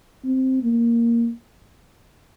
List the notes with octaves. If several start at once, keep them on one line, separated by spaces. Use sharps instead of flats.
C4
A#3